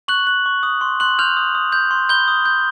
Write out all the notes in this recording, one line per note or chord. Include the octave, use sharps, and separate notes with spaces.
C#6 F#6 F#7
F#6
C#6
D#6
C6
C6 F#6 F#7
F6 G6 F7
D#6
D#6
G6
C6
B5 G6 G7
D#6
G6